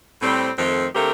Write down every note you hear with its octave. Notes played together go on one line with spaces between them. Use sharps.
A2 G3 C4
F2 D#3 A3 C4
D3 A3 C4 G4 A#4